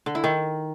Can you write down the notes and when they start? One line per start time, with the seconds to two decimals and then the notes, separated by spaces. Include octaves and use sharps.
0.06 D3
0.15 E4
0.24 D#3